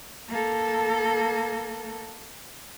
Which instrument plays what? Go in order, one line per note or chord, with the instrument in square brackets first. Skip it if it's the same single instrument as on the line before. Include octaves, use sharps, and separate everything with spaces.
[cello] A#3 A4